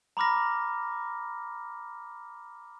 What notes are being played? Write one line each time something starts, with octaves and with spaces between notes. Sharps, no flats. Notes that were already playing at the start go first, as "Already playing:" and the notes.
A#5 B5 D6 F6 A#6